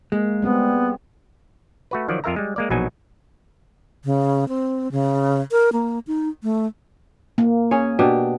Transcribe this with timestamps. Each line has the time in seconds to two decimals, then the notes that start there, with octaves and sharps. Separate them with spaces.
0.12 G#3 A#3
0.42 G3 B3 C4 G#4
1.91 A3 F#4 B4
2.08 D#3 F3 F#3 D5
2.24 F2 F4 A#4 E5 A#5
2.36 G3 G#3
2.56 G#3 A#3 D5
2.70 A#1 B2 F#3 D#4 G#5
4.05 C#3
4.48 C4
4.92 C#3
5.52 A#4
5.73 A#3
6.07 D#4
6.43 A3
7.38 A#3
7.71 C#4 G#4 C#5
7.99 B2 D4 G4